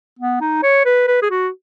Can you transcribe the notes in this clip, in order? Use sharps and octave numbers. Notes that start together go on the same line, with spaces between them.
B3
D#4
C#5
B4
B4
G#4
F#4